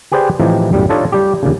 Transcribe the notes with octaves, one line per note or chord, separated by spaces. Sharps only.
G4 G#4 B4 C5 D5 G5
A2 E3 F3 C4 D#4 G4
B1 F#2 A2 G3
D4 D#4 F4 A4 C#5 D#5
G3 G4
D#2 A#2 C#3